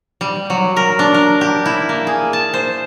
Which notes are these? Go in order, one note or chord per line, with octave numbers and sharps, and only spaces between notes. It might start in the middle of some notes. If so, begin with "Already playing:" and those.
G3
F#3
A#4
D4
A#4
G4
E4
A#3
G#4
A5
C5